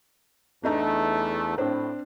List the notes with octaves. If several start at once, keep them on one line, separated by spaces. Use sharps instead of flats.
E2 A3 D4 D#4 A#5
A2 C4 D4 C5